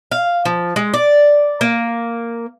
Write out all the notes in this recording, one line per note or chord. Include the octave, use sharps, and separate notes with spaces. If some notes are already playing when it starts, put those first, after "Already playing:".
F5
F3
G#3
D5
A#3